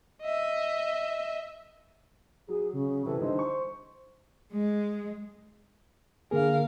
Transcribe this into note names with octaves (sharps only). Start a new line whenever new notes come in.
D#5 E5
F#3 G#4
C#3
C3 E3 A4
D3 G3 D#4 C5
C#6
G#3
D3 A#3 G#4 A#4 F5